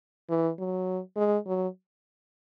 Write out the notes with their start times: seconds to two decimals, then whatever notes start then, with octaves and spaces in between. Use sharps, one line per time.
0.30 E3
0.59 F#3
1.17 G#3
1.47 F#3